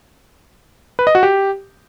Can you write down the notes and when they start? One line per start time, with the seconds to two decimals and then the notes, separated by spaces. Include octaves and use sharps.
0.99 B4
1.07 D#5
1.15 F#4
1.23 G4